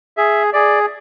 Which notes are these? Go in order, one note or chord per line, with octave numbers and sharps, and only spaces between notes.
G#4 E5
G#4 D5